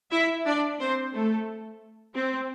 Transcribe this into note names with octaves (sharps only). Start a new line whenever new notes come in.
E4 E5
D4 D5
C4 C5
A3 A4
C4